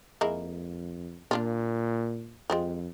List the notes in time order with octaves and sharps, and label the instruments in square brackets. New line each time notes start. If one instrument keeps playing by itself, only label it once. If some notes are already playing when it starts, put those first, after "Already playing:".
[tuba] F2 [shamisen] G#3 A#3 E4
[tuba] A#2 [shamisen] A#3 D4 F4
[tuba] F2 [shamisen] G#3 C4 F4